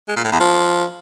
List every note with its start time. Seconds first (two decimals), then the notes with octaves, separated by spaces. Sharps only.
0.08 G#3
0.16 A#2
0.24 A2
0.32 E2
0.40 F3